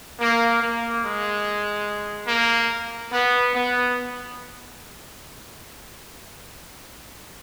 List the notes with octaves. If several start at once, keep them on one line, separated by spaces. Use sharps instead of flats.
A#3
A#3
G#3
A#3
B3
B3